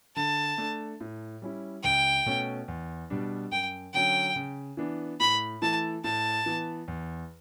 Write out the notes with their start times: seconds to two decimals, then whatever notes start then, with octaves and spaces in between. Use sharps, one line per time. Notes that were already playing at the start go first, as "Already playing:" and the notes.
0.16 D3 A5
0.58 A3 D4
1.01 A2
1.42 G3 C#4 E4
1.84 C#2 G5
2.26 B2 A3 C#4
2.68 E2
3.10 B2 G3 D4
3.51 F#2 G5
3.94 D3 F#3 C#4 G5
4.36 C#3
4.77 E3 B3 D4
5.20 A2 B5
5.62 E3 A3 E4 A5
6.04 A2 A5
6.46 E3 B3
6.88 E2